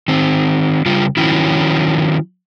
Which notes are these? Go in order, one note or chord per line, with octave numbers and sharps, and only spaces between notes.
D#3 C4
C#3 G3 F4
D#3 F3 F#3 C#4 E4